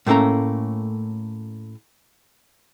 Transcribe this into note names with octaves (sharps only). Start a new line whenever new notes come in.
A2 A3 A#3 C#4 A#5